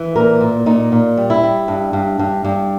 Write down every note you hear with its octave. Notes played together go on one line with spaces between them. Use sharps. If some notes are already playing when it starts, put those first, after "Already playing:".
Already playing: E3
A#2 A#4
A#2
A#2 D#4
A#2
G3
E4
G3
G2
G2
G2
G2